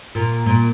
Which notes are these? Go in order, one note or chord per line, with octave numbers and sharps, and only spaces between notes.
A#2
A#2